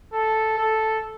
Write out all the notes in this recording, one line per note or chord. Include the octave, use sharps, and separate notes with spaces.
A4
A4